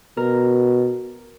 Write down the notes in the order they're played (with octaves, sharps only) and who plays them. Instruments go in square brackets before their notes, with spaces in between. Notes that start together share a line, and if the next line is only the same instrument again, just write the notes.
[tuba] B2 [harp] A#4